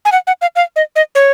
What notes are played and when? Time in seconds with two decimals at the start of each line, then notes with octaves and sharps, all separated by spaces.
0.05 G#5
0.12 F#5
0.27 F#5
0.42 F5
0.56 F5
0.76 D#5
0.96 D#5
1.15 C#5